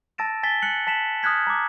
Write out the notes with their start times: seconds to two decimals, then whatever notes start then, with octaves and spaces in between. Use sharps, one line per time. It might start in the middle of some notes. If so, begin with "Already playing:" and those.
0.18 A5 E6 A6 A#6 D7 E7
0.43 G#5 A6 B6 G7
0.62 F#6 C#7 F#7
0.87 A5 B6 E7 F#7
1.23 D#6 F6 F#6 G#6 B6
1.47 A#5 D6